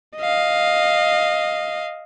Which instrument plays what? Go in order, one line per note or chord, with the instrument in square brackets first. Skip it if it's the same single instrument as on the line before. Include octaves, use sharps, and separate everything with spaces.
[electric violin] D#5 F5